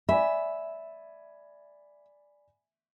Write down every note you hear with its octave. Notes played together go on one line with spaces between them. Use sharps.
D5 E5 G#5 B5